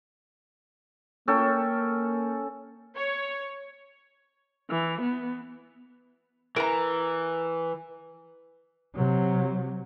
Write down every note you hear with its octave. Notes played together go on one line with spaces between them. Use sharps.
A#3 C#4 A4 G5
C#5
E3
B3
E3 A#4 A#5
C3 F#3